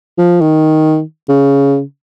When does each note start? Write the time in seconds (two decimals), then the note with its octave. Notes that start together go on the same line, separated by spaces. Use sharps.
0.18 F3
0.41 D#3
1.29 C#3